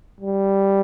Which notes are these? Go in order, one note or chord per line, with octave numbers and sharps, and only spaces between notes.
G3